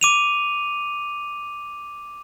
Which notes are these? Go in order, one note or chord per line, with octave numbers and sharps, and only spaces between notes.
D6 D#7 F7